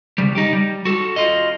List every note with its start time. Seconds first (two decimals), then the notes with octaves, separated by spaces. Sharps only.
0.18 C#3 G3
0.35 D#4 G4
0.53 G3
0.85 F#4 A4
1.16 F4 D#5